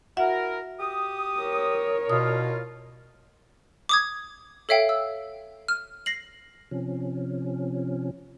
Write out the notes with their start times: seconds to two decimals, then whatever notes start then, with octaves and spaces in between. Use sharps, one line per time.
0.17 E4 F#4 A#4 E5 F#5
0.79 G4 D#6
1.39 A#4 C#5
2.10 B2 D4 E4 F4 D#6
3.89 D6 D#6 G#6
4.69 A4 C#5 E5 F5 G5
4.89 E6
5.68 F6
6.06 A#6 C7 F#7
6.71 C3 F3 C#4